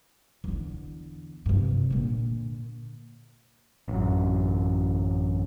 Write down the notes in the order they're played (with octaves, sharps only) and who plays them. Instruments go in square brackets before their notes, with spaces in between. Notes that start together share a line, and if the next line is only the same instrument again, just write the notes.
[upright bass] E2 D3
G2 C3
A#2 D3
[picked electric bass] A1 F#2